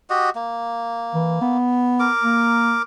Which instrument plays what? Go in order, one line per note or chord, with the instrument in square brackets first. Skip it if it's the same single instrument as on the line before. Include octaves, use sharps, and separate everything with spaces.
[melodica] F#4 G4 D#5
A#3
[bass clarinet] E3
B3
[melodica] A#4 D6
[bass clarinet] A#3